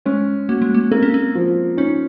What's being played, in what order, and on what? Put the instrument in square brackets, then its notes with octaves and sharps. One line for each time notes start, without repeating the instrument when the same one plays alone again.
[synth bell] G#3 [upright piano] C#4
[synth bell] A#3 [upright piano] F#4
[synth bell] G#3
A#3
[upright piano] A#3 [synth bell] C4
[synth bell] C#4
C4
[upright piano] F3
[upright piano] C#4 [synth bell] D#4